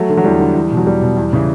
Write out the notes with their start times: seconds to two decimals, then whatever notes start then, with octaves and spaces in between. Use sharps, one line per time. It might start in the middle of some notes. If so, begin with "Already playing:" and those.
Already playing: F#3 A3
0.09 D3
0.17 F#3
0.24 E2 G3
0.40 D3
0.55 E2
0.71 B2
0.77 F#3
0.86 E2 G3
1.01 B2
1.17 E2
1.33 C#3 E3